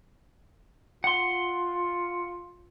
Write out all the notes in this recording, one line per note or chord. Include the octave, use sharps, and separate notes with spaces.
F4 F#5 C6